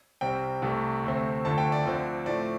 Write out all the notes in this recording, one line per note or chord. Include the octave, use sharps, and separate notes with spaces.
C2 C3 G3 C4 G5
C2 C3 A3
D2 C3 A3 C4
D2 D3 F3 A3 A5
G5
D5
D2 D3 F3 C4
A2 F3 A3 C4 D5